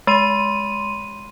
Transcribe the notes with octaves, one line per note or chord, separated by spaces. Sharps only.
G#3 C6 D#7